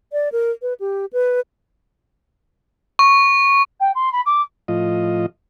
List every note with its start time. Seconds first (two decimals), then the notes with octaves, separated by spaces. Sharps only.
0.13 D5
0.32 A#4
0.62 B4
0.80 G4
1.13 B4
2.99 C#6
3.80 G5
3.95 C6
4.12 B5
4.26 D6
4.68 A2 F3 F4 D#5